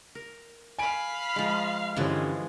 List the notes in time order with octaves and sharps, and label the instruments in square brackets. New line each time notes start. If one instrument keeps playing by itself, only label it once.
[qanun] A#4
[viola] F5 B5 [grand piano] G#5 D7
[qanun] F3 G#3
[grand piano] G2 D3 C#4 [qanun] E3 F3 B4 [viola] G#3